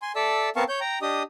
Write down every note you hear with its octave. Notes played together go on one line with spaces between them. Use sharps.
G#5 C6
A4 D5 E5 A5 E6
B3 C4 A#4 F5 A5 C#6
C#5 G6
G5 A#5
D4 G4 D#5 D#6